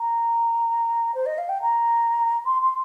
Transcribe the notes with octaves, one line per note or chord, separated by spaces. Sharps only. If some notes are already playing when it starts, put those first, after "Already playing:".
Already playing: A#5
C5
D#5
F5
G5
A#5
C6
C6